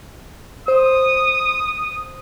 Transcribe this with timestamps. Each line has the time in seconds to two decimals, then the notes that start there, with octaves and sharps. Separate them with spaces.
0.68 C5 D#6